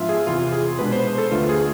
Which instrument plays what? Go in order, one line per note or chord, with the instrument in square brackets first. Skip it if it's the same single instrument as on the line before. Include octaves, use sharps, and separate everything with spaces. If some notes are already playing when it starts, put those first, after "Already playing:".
Already playing: [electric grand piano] G#2 F3 B3 D4 F4 E5
G#4
E2 C3 E3 F4
G#4
B2 G#3 B3 D4 B4
C5
A4
D2 D3 A3 F4
G#4